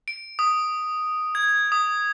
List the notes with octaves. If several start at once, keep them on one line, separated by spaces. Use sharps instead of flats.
D7
D#6
G#6
D#6